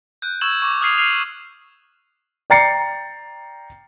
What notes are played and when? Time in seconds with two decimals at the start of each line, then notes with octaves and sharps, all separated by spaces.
0.22 F#6 G6
0.41 C#6 E6 G#6 E7 F#7
0.62 C#6 D6
0.82 D#6 F6 G#6 C7 D#7 F7
0.98 F6 C7 D#7 F7
2.50 D5 G5 A#5 A6 C7 C#7